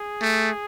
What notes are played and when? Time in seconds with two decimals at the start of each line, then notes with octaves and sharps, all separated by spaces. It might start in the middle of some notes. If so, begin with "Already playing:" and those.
Already playing: G#4
0.22 A3